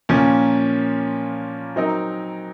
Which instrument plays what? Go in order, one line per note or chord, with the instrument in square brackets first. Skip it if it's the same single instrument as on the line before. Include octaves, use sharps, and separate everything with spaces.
[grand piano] A#2 F3 A#3 C#4
F#3 C4 D#4 A#4